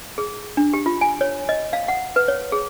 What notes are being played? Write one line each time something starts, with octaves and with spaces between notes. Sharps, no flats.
G#4
D4
G4
F4
G#5
C#5
D#5
F5
F#5
B4
C#5
G#4